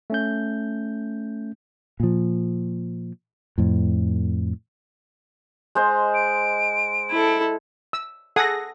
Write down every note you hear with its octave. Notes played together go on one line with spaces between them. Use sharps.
A3 C#4 G6
A#2 F3
F2 A2
G#3 C5 D#5
D7
E4 A4
E6
G#4 A4 F#5 D#6 A#6